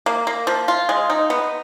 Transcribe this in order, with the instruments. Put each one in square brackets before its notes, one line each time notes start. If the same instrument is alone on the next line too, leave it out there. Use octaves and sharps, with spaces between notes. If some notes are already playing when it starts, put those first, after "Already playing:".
[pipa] A#3
A#3
F3
F4
G#3
D#4
B3